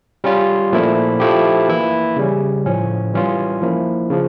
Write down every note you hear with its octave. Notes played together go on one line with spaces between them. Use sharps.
G3 C#4 F4
A#2 F3 A3 E4
F3 A3 E4 G4
E3 A#3 E4
C#3 G3 C#4
A2 F3 C#4
E3 G3 C#4 F4
F3 A#3 E4
C#3 F3